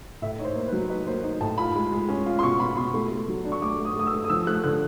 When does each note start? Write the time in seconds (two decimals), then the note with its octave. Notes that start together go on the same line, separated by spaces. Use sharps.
0.22 A2 E5
0.39 D#4 C#5
0.44 C5
0.55 A#3
0.68 B4
0.73 F#3
0.90 D#4 B4
1.07 A#3 C5
1.24 D#4
1.40 A2 A5
1.58 F4 B5
1.76 G#3
1.92 G#3
2.09 C#4
2.26 F4
2.39 C6
2.43 B2 C#6
2.59 F4 B5
2.77 B2 C6
2.94 A3
3.11 A3
3.28 F#3
3.45 D4
3.52 C#6
3.62 A3 D6
3.79 A3
3.85 D#6
3.96 A3 D#6
4.07 E6
4.13 A3
4.24 D#6
4.30 F3 E6
4.47 A3 F#6
4.63 D3 F#6